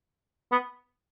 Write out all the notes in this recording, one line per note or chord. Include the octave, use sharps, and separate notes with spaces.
B3